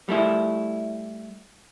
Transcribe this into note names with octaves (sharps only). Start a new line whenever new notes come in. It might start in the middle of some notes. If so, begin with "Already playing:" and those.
G3 A3 E4